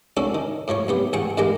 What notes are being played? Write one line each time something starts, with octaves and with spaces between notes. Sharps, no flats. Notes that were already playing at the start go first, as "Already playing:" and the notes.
C#4 D4 F#4 A4
D#3
A2 F3 F#3 C#5
B1 B3 G4
A1 G#4 F#5 G5 C#6
A1 A#2 G#3 A#3 G4 A#5